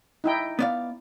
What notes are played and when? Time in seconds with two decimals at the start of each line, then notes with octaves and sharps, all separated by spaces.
0.24 D#4 E4 G5
0.59 B3 D5 F5